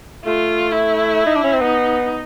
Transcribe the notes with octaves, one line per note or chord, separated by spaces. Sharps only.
A3 F4
E4
D#4
D4
C#4
C4
B3 D#4